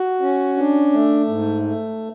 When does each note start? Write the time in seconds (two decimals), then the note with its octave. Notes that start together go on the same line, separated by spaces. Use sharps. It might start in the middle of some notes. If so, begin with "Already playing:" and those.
Already playing: F#4
0.21 C#4
0.57 D4
0.93 A3
1.28 G#2
1.63 A3